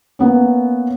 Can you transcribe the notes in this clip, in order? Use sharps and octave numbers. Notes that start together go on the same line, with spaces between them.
A#3 B3 C#4